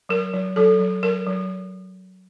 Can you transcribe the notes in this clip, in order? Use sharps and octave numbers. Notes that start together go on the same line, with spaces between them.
F#3 A#4
F#3
F#3 A4
F#3
F#3 A#4
F#3